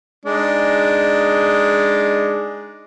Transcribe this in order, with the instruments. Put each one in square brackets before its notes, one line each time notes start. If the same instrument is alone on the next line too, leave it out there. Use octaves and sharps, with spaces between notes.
[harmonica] G#3 D4 D#4